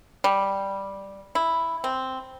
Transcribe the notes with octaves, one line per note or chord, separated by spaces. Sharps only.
G3
E4
C4